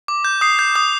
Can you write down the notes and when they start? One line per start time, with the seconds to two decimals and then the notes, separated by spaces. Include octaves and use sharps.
0.08 D6
0.25 G6
0.41 D#6 C7
0.59 G6
0.76 D#6